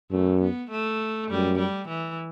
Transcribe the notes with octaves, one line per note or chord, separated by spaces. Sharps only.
F#2 A3
B3
A3
F#2 G3
G3
E3